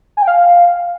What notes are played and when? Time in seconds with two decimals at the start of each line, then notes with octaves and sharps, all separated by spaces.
0.17 G#5
0.22 G5
0.27 F5